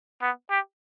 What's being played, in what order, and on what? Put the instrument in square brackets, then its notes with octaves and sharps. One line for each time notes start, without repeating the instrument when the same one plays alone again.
[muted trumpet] B3
G4